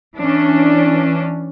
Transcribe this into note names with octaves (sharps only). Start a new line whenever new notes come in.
E3 C#4 D4